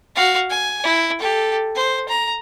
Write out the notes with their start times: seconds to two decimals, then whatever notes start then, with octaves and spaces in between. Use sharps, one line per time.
0.16 F#4 F5
0.50 G#5
0.84 E4
1.19 G4 A4
1.76 C5
2.09 A#5